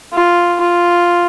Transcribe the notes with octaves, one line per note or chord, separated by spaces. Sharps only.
F4
F4